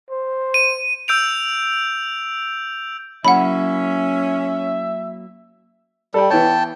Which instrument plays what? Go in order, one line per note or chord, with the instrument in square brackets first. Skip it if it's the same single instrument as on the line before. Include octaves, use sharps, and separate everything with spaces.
[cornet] C5
[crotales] D#7
E6 G6 D7 F7
[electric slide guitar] F#3 A#3 E4 [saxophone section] C#4 [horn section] E5 [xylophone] F#5 B5
[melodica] G3 [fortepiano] A4 G5
[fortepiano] E3 B3 C#5 [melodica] G5 A5